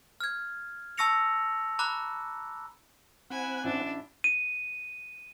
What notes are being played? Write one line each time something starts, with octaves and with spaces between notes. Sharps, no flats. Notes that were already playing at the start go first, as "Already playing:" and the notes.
F6 G#6
A5 C#6 E6 A#6 C#7 F7
A#5 B5 D6 F#6
C4 E4 F#5 G#5
A1 D4 E4
D#7